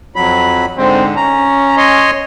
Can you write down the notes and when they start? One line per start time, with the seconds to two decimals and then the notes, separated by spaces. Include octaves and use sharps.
0.16 F2 F#3 B5
0.78 G#2 D3 G#3 C4
1.16 C#4 A#5
1.77 C#5 D#5 C6